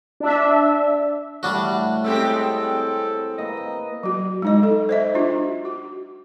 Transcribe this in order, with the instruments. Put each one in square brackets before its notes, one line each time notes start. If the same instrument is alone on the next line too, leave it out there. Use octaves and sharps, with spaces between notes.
[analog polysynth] D4 E5
[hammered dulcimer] A2 F#5 [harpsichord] G3 D4 F#4
[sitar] G#3 C4 G4 [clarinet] A4
[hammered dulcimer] A#3 B4 [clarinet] D#5
[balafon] F#3 F#4
G#3 D#4 D#5
A4
C5 D#5 E5
D4 F4 F#4
F#4